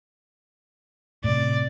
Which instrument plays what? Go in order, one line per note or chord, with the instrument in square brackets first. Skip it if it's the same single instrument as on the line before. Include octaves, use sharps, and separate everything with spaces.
[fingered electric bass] A2 C3 [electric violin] D5